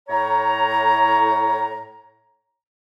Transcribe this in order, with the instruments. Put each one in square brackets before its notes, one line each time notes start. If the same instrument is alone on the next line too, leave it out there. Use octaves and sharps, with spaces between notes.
[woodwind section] A2 C#5 A#5